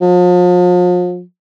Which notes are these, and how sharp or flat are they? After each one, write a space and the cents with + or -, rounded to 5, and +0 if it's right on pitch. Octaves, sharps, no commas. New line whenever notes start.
F3 +40